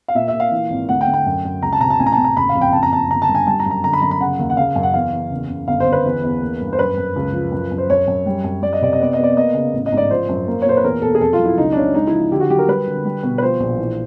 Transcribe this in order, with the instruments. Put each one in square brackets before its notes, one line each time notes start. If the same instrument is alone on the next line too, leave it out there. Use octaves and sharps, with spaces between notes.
[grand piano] F5
A#2 E5
E5
A#2
F5
E3
G#1
D2 F#5
G5
D2
G5
F#2
F#2
C#2 A#5
A5
C3 A#5
A5
A1 G#5
A#5
A5
A1
A#5
F#1 B5
F5
F2
G5
F#1 A5
A#5
F#1 A5
G1 A#5
A5
G2
G#5
G3 A5
A#5
F#2
A#5
D3 A#5
B5
F#2 A#5
B5
C#3 F#5
D#2
F#5
C#3 F5
F#2
F#5
E2 F5
E2
F#1
F#1
G1 F5
C5
G1
B4
E2
E2
A#3
G2
C5
F#2 B4
F#2
C#2
F3
F#2
F#2
C5
F#2 C#5
F#2
G3
F#2
G3 D5
D#5
C3 D5
D#5
B3 D5
D#5
B3
D5
A#3 D#5
C#3
A1
D#5
G#2
D5
F3 C5
F#2
A#3
C#5
A#2 C5
B4
E2 A#4
B2 A4
G#4
F2 A4
F4
F#3
E4
C#2 D#4
D4
C#3 C#4
G#3 D#4
E4
F3
D3 G4
F#4
F#3 G4
A#4
G3 B4
D3
G3
B2
B4
F3 C5
A#1
E3